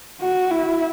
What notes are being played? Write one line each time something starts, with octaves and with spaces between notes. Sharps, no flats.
F#4
E4